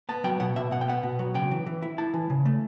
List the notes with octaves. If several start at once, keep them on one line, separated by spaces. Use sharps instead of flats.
B3 A5
F#3 G5
B2 F#5
B2 E5
B2 F#5
G5
B3 F#5
B2
F#3
C#3 G5
E3
E3
E4
E4 A5
E3
C#3
A3